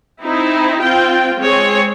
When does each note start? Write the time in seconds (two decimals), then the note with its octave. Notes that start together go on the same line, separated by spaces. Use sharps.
0.23 C4 D#4 E4
0.82 C4 F4 G5
1.39 G#3 C4 G#4 C#5